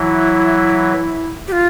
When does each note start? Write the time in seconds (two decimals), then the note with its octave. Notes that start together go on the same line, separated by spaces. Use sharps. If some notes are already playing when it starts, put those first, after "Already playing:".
Already playing: E3 F#3 E4
1.48 G4
1.52 F4